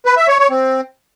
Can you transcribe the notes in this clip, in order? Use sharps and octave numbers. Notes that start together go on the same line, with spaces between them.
B4
E5
C#5
C#5
C4